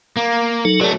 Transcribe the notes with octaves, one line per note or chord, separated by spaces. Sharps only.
A#3
F#3 D#4 A4
F#3 A3 G#4 A#4 D5